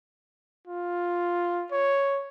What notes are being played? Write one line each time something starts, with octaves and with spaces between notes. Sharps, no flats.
F4
C#5